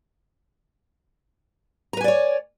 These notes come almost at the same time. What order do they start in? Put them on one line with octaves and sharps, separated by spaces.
A#5 B4 G#5 D5 C#5